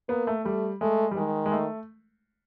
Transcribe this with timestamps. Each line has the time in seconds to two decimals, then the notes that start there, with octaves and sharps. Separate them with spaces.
0.09 A#3 B3
0.27 A3
0.45 G3 A3
0.81 G#3 A3
1.11 G3
1.16 D#3 G#3
1.46 G#3
1.52 A3